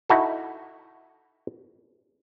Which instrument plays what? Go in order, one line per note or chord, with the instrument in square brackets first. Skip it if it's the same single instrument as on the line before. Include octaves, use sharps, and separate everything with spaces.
[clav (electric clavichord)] D#4 E4 F#4 A4